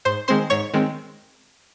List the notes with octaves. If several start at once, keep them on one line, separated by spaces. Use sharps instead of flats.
G#2 C5 C6
D#3 G#3 C4 C5 C6
G#2 C#5 C#6
D#3 G#3 C4